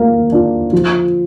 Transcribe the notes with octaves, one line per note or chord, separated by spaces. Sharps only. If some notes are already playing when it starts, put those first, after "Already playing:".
Already playing: A#3
D4 F4
F3